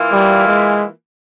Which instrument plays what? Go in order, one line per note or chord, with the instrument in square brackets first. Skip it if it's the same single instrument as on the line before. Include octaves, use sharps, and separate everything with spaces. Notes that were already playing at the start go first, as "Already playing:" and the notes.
Already playing: [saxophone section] E3 A#3 F4
[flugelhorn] G3
G#3